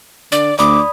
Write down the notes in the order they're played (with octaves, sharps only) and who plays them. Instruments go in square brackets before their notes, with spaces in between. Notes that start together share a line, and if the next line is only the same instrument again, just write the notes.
[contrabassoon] D3 [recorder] D5
[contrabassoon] D2 [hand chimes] D5 B5 D#6 [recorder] D6